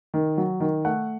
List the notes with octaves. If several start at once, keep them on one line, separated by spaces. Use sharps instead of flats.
D#3
F#3
D#3
A3 F#5